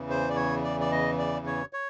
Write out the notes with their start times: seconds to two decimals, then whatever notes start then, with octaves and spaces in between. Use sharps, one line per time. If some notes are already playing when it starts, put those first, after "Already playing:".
Already playing: E2 C#3 E3
0.10 C5
0.29 D5
0.36 C#5
0.63 D5
0.80 D5
0.92 D#5
1.19 D5
1.46 C#5
1.73 C#5